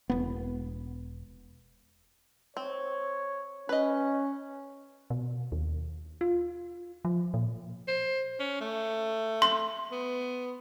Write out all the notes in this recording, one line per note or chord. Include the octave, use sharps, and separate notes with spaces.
E1 B3
C4 C#5
C#4 B4 D#5
B2
D#2
F4
F3
A#2
C5
C#4
A3
C6
B3